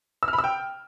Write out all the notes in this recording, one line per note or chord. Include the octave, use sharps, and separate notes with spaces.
E6
F6
B5
E6
G5